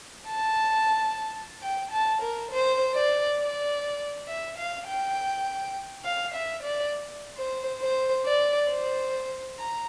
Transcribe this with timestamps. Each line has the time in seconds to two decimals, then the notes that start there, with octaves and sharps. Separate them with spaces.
0.29 A5
1.62 G5
1.92 A5
2.22 A#4
2.51 C5
2.95 D5
3.39 D5
4.28 E5
4.57 F5
4.87 G5
6.04 F5
6.34 E5
6.63 D5
7.37 C5
7.81 C5
8.26 D5
8.69 C5
9.58 A#5